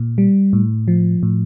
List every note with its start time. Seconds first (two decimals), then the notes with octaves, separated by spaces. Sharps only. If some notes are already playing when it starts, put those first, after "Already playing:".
Already playing: A#2
0.18 G3
0.53 A2
0.88 F3
1.23 A2